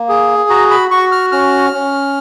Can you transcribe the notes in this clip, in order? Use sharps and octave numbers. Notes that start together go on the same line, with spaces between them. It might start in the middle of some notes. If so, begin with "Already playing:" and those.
Already playing: A#3
G#4
F#4 A#5
B5
F#4 C#6
F6
C#4 F6
C#4